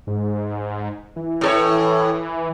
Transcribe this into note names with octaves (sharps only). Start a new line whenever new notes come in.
G#2
E3
A2 A4 C#5